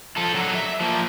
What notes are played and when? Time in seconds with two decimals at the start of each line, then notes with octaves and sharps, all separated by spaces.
0.17 F3 A4
0.35 D3 F#3
0.55 E5
0.81 F3 A#3